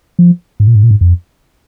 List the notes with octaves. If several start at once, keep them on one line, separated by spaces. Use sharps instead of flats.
F3
G#2
A#2
G#2
A#2
G#2
F2